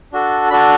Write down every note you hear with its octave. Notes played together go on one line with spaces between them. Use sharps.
D4 F#4 A4
D4 F#4 A4 B5